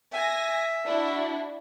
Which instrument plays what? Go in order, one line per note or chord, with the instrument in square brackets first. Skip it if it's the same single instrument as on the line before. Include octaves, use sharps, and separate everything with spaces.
[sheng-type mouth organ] E5 [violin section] G#5 A#6
[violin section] D4 E4 F#4